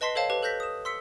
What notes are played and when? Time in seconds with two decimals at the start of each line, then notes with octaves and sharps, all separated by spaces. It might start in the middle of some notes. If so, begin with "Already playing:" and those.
0.01 B4 D#5 A5 C6 B6 C7
0.15 A4 C5 C#5 F5 A5
0.30 G4 B4 A5
0.43 A4 F#6 G6 A#6 B6
0.60 D#6 E7
0.85 C6 E6 B6 C#7